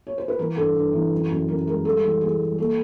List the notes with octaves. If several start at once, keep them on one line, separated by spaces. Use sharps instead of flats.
C#5
C5
B4
E3 A#4
G2 A4
G2
E3
F#2
F#2
F#2 A#4
G#3 A#4
G3 A4
E3
E3 G#4
G3
A#3 A4